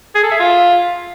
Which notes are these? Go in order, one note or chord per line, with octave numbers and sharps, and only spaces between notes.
G#4
A4
E5
F4